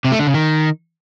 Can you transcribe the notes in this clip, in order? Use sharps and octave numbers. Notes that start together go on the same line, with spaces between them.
C3
A3
D3
C#3
D#3